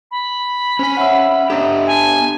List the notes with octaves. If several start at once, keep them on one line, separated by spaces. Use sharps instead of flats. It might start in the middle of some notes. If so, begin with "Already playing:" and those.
B5
C#4 C5 G#5
C#5 E5 F#5 E6
B3 D4 G4 A4 D#5 E5 A#5
G#5 A5